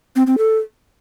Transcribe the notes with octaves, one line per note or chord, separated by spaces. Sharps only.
C4
C4
A4